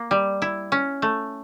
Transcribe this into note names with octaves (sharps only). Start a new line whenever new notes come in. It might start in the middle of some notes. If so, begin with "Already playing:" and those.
Already playing: A#3
G3
E4
C#4
A3